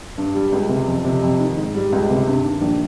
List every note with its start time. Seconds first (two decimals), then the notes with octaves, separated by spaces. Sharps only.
0.18 G2
0.35 G3
0.52 C#2
0.69 C3
0.88 F2
1.05 C3
1.23 F2
1.40 D#3
1.57 G#2
1.75 G3
1.92 C#2
2.10 C3
2.27 G2
2.44 D#3
2.61 A#1